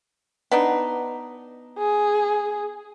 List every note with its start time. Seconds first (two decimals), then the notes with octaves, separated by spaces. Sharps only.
0.52 B3 D4 D#4
1.78 G#4